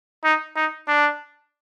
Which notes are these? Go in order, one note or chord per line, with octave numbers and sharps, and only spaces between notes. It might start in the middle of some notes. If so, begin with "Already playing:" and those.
D#4
D#4
D4